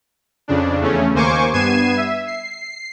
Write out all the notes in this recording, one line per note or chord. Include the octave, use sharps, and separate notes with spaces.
F2 C#3 D4
E2 C#3 A3 C#4
D#2 A#3 C5 G#5 C#6 D6
G2 B3 G#6 C7 D#7 E7
E5
C7